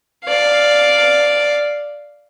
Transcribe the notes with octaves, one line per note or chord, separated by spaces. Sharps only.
D5 F5